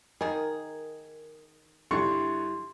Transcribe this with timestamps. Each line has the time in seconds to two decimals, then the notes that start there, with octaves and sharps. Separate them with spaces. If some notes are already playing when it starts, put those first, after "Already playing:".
0.21 D#3 D#4 G#4 A#4
1.91 G2 D3 G3 E4 E5 C6 C#6